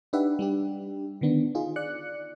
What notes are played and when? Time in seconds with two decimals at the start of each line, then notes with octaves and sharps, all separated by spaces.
0.13 D4 D#4 G4 B4 E5 F#5
0.39 G3 D4 G4
1.21 D3 D#3 B3 D4
1.55 D#4 F4 G#4
1.76 D5 F#6 C#7